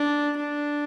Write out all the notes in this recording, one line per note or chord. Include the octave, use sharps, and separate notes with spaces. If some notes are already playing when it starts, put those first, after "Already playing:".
Already playing: D4
D4